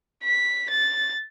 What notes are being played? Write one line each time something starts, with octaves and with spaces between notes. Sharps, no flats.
B6
A6